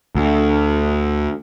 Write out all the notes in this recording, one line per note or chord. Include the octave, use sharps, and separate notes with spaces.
D2